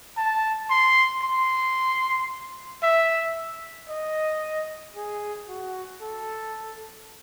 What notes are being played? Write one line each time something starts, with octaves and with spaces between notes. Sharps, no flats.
A5
C6
C6
E5
D#5
G#4
F#4
A4